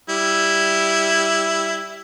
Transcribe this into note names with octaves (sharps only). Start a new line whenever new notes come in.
G3 E4